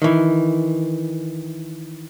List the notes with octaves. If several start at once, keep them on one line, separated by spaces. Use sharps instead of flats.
D#3 E3